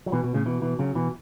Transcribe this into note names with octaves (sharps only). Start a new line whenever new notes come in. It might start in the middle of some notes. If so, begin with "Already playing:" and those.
F#3
B2 E3
B2
A2 C#3
B2 E3
B2 E3
C#3 F#3
B2 E3